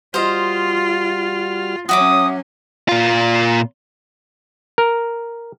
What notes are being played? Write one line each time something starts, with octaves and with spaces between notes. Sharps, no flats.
G3 F4 F#4 C5 D#5 F6
F#3 C#4 F#4 E5 D6 D#6
A#2 F4
A#4